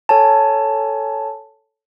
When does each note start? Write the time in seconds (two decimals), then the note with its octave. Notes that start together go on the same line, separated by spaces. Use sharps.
0.09 A4 C#5 G#5 A5